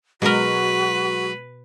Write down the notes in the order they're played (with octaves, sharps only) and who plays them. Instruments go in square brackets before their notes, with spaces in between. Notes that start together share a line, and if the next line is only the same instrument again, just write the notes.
[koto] B2 A#4 [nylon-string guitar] F#3 G#3 [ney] F#4 [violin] B4